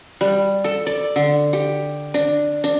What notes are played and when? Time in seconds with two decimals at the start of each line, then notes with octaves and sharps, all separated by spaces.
0.21 G3
0.64 A4
0.87 D5
1.16 D3
1.53 G4
2.14 D4
2.64 D4